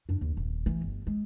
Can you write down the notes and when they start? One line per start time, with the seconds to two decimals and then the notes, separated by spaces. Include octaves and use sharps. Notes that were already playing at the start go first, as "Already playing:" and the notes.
0.09 F#2 D4
0.21 D#2
0.37 D#1
0.66 E3 A3
0.81 G1
1.07 G#3